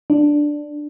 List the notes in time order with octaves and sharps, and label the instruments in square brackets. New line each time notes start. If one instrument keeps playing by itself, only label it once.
[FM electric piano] D4